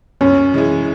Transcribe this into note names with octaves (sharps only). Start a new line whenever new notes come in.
F#2 C#4
E3 G#3 E4 G#4